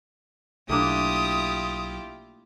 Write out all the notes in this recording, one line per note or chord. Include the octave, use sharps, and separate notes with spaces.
B1 A3 A#3 D4 E4 F4 G4 D#6